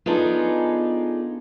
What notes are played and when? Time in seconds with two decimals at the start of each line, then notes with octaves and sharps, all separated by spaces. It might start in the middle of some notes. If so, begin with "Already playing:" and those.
0.06 B3 D4 D#4 F4 G#4 A4